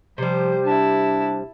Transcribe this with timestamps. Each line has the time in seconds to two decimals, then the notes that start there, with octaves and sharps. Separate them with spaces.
0.18 C3 F3 G3 C5
0.65 D4 E4 A5